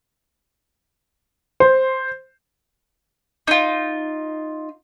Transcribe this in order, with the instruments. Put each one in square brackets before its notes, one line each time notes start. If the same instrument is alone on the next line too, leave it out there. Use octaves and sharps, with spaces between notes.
[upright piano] C5
[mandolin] D#4 F4